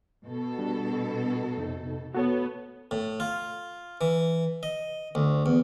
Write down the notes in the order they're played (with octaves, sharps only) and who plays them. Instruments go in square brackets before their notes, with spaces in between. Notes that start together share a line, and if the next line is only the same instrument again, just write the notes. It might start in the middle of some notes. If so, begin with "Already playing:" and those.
[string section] B2 A4
[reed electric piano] G3 D4
F2 C3 D#4
[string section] B3 [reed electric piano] F#4 A4 C#5
[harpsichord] A2
F4
E3
D#5
D2
E2